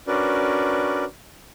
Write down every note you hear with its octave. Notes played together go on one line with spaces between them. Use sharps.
C#4 D4 F#4 A#4 B4 D5